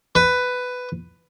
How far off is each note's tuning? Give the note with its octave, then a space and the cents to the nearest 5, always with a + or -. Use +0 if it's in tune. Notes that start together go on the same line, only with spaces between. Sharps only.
B4 +10